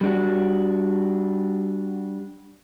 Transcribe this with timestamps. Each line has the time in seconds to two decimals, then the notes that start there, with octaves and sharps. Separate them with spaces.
0.01 G3 D4 F#4